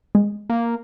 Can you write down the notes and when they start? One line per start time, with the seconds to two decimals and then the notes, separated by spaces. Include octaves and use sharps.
0.15 G#3
0.50 A#3